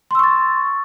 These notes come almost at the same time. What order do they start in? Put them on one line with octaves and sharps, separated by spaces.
C6 E6 C#6 A6